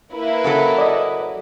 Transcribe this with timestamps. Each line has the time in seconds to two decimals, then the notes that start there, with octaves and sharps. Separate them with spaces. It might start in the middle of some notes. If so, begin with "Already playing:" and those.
0.13 A#3 E4 B4
0.44 C#3 F#3 A4
0.78 D5 D#5